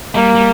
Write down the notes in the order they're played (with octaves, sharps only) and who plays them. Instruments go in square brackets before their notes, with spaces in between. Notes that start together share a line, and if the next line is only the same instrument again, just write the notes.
[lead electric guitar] G3 [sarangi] A#3
[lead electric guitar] G3